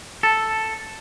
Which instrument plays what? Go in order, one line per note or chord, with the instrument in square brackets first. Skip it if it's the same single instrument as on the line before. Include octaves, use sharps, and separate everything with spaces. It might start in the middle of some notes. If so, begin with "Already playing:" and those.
[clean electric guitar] A4